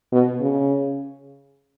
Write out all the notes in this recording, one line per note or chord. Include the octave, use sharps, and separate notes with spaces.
B2
C#3